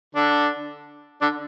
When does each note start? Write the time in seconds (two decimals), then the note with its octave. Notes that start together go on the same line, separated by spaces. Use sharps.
0.15 D3 D4
1.21 D3 D4